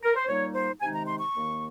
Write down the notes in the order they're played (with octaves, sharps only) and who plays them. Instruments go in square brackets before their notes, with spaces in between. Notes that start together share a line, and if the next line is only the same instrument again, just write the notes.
[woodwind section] A#4
C5
A#2 G3 A#3 D#4 C#5
C5
C3 D#3 G#3 D#4 G#5
A#5
C6
C#6
D#2 D#3 A#3